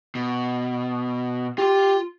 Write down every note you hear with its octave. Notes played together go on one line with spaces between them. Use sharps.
B2
F4 G4 C6